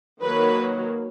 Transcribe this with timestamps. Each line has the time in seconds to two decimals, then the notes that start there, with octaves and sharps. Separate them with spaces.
0.22 D#3 F#3 A#3 B4